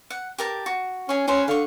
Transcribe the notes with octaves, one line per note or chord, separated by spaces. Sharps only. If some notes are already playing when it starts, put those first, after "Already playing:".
F#5
G4 A#4 A5
F#4
C#4 G#4 C#5
C#4 G#4 B4 C5
D3 F5 C#6